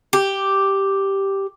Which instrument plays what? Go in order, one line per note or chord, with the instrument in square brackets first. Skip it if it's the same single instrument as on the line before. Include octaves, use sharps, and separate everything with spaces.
[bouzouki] G4